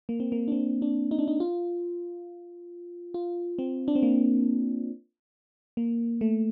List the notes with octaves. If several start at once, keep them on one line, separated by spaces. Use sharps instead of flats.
A#3
C4
A#3
D4
C4
D4
D#4
D4
D#4
F4
F4
C4
D4
C4
A#3
A#3
A3